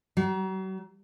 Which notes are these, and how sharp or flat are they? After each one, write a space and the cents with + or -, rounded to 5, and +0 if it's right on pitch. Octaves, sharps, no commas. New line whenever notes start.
F#3 +40